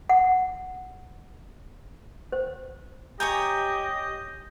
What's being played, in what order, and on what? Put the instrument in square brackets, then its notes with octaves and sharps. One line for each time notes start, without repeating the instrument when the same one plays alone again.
[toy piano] F#5
C5
[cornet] G4 [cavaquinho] C#5 G#5 A#5 [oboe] D#5 [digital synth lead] G6